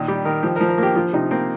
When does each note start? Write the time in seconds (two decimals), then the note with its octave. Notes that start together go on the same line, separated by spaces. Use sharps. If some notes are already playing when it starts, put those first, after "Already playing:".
Already playing: A#2 D#3
0.08 G3 G4
0.25 D#3 A#4
0.43 F3 G4
0.56 A#4
0.61 F3
0.69 A#4
0.78 A#3 G4
0.95 F3 F4
1.13 C3 D#4
1.31 A#3 C4